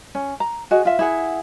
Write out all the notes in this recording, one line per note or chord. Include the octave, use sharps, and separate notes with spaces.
C#4
A#5
F#4 G#4 D#5
F4 E5
E4 G#4 F#5